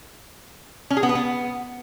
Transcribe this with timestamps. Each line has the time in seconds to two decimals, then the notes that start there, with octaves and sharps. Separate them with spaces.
0.90 C#4
0.97 G#4
1.03 B3
1.09 B4
1.15 B3